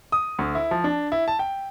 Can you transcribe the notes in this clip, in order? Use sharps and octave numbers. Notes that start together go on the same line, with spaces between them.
D#6
D2
E4
F3
D4
E4
A5
G5